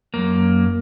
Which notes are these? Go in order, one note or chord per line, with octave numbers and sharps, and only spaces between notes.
F#2 A#3